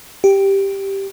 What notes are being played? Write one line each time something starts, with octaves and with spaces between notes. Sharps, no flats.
G4